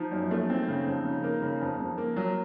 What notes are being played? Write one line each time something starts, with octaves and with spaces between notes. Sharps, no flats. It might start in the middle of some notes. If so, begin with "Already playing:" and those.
Already playing: F3 D#4
F#2
A3
C4
C#3
F2
C#3
A#3
C#3
F2
F2
A#3
F#3